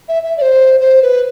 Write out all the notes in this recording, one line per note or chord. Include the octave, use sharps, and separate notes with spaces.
E5
E5
D5
C5
C5
B4